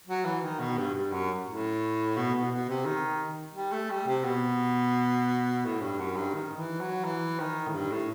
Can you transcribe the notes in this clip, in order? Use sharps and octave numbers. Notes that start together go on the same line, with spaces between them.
F#3
E3
D#3
B2
G2
G2
F#2
A2
B2
B2
B2
C3
D#3
G3
A3
G3
C3
B2
A2
G2
F#2
G2
D#3
E3
F#3
E3
D#3
A2
G2
A2